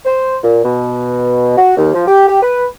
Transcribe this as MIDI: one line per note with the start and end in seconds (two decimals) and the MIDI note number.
0.05 0.37 72
0.43 0.62 46
0.64 1.54 47
1.57 1.74 66
1.76 1.92 39
1.93 2.03 53
2.07 2.26 67
2.27 2.42 67
2.42 2.65 71